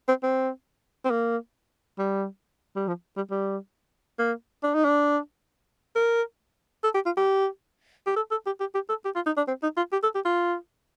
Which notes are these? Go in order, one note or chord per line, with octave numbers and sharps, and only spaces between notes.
C4
C4
C4
A#3
G3
G3
F3
G3
G3
A#3
D4
D#4
D4
A#4
A4
G4
F4
G4
G4
A4
A4
G4
G4
G4
A4
G4
F4
D#4
D4
C4
D#4
F4
G4
A4
G4
F4